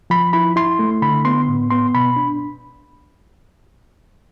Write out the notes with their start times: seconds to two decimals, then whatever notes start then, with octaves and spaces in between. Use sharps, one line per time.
0.10 F3 B5
0.33 E4 B5
0.56 E4 C6
0.79 A3
1.02 D3 B5
1.25 B3 C6
1.48 A2
1.70 B3 C6
1.95 B2 B5
2.16 D4